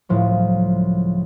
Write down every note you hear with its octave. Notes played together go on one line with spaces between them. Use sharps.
C#2 A2 F3 F#3